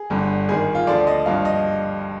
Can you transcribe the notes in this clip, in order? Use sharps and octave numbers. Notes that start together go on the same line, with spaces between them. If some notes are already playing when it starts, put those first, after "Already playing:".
Already playing: G#4
G1 G2 D3
G#1 G#2 D#3 G#4
F4
D2 D3 F3 D5
D#5
G#1 G2 F3 F5
D#5